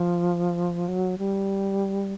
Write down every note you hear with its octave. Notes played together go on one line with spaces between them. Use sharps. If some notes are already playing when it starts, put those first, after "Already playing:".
Already playing: F3
F#3
G3